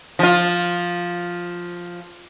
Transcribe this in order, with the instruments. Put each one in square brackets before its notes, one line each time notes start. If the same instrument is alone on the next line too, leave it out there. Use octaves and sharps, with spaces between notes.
[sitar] F3 F4